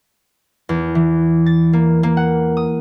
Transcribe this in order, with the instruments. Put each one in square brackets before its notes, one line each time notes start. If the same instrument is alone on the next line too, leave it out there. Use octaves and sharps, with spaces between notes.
[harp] E2
E3
A6
A#3
A#3
F#5
D#6